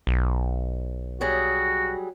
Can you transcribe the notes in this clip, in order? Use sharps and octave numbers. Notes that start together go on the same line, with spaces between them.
B1
F#3 G3 F#4 G#4